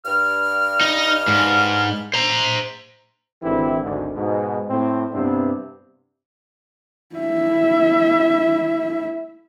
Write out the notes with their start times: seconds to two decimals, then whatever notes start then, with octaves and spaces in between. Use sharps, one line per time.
0.05 G2 F6
0.81 D#4 D#5
1.28 G#2
2.14 C5 A#5
3.43 G#1 D3 E3 C4 E4 G4
3.82 G#1 D2 G#2 D3
4.15 G#2 B2
4.69 A2 C4
5.12 G2 C3 B3 C4 D4 E4
7.16 E4 E5